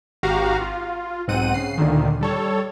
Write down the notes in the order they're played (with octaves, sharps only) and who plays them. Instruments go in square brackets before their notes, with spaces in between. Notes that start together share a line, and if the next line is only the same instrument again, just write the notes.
[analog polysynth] G#1 F#4 G4 F5 A#5
F4
B1 G#2 C4 F#5 D#7
C#3 C7
D2 A#2 D3 D#3
G3 A4 C#5